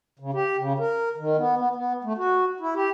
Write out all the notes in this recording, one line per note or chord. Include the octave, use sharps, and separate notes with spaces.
C#3
G4
C#3
A#4
D#3
B3
B3
B3
A3
F#4
E4
G4